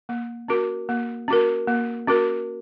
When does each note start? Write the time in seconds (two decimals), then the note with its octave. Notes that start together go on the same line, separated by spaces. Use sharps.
0.09 A#3
0.48 C#4 F#4 A#4
0.89 A#3
1.28 C#4 F#4 A#4
1.67 A#3
2.07 C#4 F#4 A#4